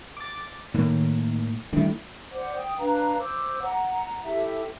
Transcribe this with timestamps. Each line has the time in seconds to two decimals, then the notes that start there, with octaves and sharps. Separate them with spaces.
0.17 D6 A6
0.74 A2 D#3 A#3
1.73 D3 D#3 G3 A3 E4
2.32 C5 D5 F#5 D6
2.55 G5 D#6
2.79 D4 B4 F5 A#5
3.19 C5 D6 E6
3.63 F#5 A#5
4.23 E4 G4 A4 E5